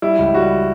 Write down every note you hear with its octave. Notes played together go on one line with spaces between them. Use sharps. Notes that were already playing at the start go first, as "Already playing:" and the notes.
G3 E4
C#2
G3 F#4